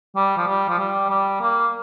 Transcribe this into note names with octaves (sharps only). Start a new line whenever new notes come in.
G3
F3
G3
F3
G3
G3
A#3